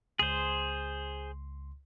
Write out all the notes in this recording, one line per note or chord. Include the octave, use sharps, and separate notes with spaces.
C#2 G#4 C5 C6